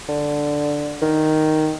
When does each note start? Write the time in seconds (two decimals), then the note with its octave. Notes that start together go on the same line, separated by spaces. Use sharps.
0.09 D3
1.02 D#3